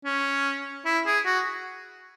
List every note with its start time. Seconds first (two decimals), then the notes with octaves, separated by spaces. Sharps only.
0.05 C#4
0.85 E4
1.06 G#4
1.25 F#4